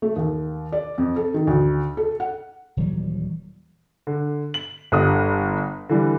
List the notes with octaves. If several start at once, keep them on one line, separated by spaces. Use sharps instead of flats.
A3
D#2
D5
F2
A4
D#3
D2
A4
F#5
D#1 E3 F#3 G3
D3
F#7
G1 D3 G3 D#6
D3 E3 G3